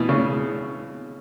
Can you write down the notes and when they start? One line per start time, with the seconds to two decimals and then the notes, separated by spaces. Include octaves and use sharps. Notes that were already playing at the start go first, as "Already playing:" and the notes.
Already playing: B2 E3
0.09 C#3